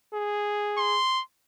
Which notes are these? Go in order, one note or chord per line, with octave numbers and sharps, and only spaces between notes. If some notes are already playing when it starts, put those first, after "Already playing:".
G#4
C6